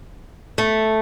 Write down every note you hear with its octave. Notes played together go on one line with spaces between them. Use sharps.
A3